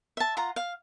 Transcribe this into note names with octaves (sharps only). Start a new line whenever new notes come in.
E5 A5
F4 F#5 A#5
F5